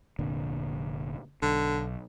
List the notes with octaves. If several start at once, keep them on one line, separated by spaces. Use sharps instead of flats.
F1 A#2 D3
B1 D3